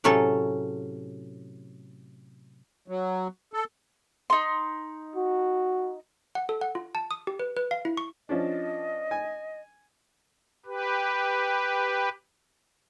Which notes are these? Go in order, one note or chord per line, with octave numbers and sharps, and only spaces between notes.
A2 C3 F#3 C#4 G#4 A4
F#3
A4
D#4 C6
F#4
F#5
A4
F#5
F4
A5
D#6
G4
B4
B4
F5
E4
C#6
F3 C#4 D4 D#5
G#5
G4 B4